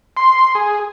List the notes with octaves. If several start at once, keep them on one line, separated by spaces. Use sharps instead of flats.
C6
G#4